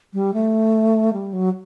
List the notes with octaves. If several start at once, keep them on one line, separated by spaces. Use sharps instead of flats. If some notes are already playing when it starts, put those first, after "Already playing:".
G3
A3
G3
F#3